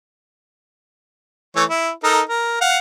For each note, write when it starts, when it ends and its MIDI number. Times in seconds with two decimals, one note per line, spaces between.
1.56 1.64 52
1.56 1.64 57
1.56 1.64 73
1.69 1.91 64
2.04 2.21 63
2.04 2.21 69
2.04 2.21 70
2.29 2.59 70
2.61 2.79 77
2.61 2.79 78